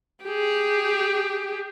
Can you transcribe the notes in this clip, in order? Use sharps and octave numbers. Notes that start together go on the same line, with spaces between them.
G4 G#4